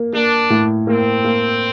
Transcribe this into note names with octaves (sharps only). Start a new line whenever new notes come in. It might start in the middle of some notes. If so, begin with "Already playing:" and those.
Already playing: A#3
A#3 D4
A2
A#3 C4
A#3